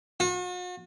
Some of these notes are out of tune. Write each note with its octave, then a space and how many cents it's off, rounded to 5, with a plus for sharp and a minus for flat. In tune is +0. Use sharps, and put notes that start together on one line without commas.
F#4 -45